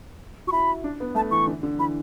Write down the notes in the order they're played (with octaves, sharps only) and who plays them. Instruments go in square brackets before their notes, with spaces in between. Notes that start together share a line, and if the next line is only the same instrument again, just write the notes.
[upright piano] F#4 [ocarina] C#6
[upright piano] E4 [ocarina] B5
[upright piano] D4
B3
[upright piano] A3 [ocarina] A5
[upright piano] E3 [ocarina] C#6
[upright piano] D3
D3
[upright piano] E3 [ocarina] B5